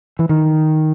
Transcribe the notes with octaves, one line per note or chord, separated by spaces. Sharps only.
E3
D#3